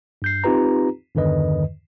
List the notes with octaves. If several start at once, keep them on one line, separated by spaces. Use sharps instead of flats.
G2 G6 C7
C4 D#4 F4 G4 B4 A#5
E2 G2 D3 D#3 B4 D#5